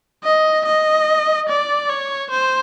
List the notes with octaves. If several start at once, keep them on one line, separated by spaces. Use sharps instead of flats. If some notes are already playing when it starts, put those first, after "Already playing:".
D#5
D#5
D5
C#5
C5